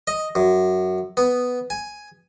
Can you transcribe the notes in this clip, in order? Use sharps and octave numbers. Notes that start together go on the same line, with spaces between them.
D#5
F#2
B3
G#5